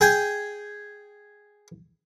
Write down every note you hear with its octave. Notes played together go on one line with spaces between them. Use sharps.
G#4 G5 G#5